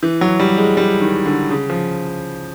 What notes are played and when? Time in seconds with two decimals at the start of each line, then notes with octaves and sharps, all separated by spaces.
0.03 E3
0.21 F#3
0.40 G3
0.58 G#3
0.77 G3
1.01 D#3
1.26 D3
1.50 C#3
1.70 F3